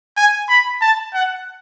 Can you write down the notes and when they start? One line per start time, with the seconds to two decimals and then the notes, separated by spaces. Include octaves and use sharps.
0.17 G#5
0.49 B5
0.81 A5
1.14 F#5